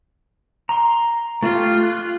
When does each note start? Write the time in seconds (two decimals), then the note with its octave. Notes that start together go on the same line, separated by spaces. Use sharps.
0.69 A#5 C6
1.43 A3 F4 G4
1.83 F#6